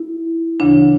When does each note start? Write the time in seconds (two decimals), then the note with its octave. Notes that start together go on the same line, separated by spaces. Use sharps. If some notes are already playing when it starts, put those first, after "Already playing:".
Already playing: E4
0.60 D2 C#3 E3 D4